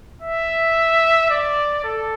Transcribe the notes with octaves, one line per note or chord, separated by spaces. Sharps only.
E5
D5
A4